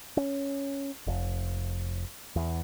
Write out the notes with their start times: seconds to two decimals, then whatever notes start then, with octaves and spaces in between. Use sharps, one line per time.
0.17 C#4
1.07 F1
2.36 E2